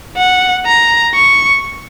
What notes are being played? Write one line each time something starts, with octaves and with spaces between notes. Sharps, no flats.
F#5
A#5
C#6